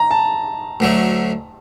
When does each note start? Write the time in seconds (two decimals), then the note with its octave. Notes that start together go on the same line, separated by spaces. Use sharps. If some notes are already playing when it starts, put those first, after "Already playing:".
Already playing: A#5
0.11 A5
0.80 D2 D3 F#3 A3